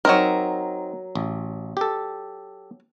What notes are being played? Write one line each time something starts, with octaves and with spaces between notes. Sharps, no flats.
F#3 C4 D#4 A#4
A1
G4 A4